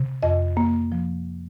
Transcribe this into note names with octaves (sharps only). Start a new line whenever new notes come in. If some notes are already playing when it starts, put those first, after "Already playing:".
Already playing: C3
F2 D#5
A#3
F3